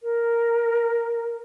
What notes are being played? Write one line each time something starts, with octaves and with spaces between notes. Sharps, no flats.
A#4